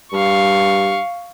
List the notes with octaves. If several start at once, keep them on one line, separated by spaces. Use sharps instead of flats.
G2 F5 C#6